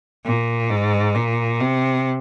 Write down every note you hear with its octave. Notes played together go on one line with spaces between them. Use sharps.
A#2
G#2
A#2
C3